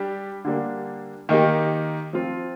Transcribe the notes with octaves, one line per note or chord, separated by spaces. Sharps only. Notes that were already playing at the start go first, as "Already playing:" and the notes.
Already playing: G3 D4 G4
D3 G3 A#3 D4
D#3 A#3 D#4 G4
F3 C4 F4